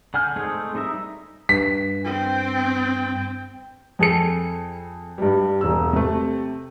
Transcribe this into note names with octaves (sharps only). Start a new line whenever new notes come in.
D3 F#5 G#5 F6 G6
G#3 A3 C4 D#4 G#4
G3 D#4 A#4 E5
G2 B6
C4 G5
F2 G#4 A4 C#7
G2 G3
E1 E6
C3 A3